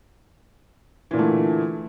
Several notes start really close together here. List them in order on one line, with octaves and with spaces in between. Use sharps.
E3 A#2 D3 A3